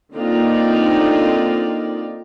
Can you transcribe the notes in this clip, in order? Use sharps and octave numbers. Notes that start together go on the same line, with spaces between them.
D3 A#3 C4 D#4 F4 D5